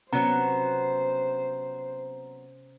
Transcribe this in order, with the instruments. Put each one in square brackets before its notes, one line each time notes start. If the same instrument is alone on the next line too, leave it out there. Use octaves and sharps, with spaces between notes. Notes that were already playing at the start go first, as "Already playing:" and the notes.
[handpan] C3 C#4 [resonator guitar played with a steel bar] F#3 B3 [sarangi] C5 [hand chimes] A#5